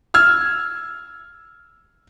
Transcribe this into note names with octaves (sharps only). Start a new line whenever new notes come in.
E6 F6 G#6